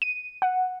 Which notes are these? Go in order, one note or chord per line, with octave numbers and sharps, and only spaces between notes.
D#7
F#5